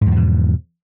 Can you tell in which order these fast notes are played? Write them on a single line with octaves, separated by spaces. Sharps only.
G#2 E2 F3 B2